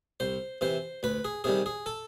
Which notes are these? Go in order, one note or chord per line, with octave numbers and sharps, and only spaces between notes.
C2 C5
C3 E3 C5
D2 B4
G#4
C3 D#3 G3 G#4
G#4
A4